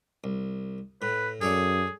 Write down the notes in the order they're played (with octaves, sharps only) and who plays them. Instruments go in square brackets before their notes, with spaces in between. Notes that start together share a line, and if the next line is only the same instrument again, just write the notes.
[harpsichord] C2
[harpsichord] A2 [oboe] B4
[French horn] F#2 [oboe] G#4 [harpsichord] A4 C#5 D5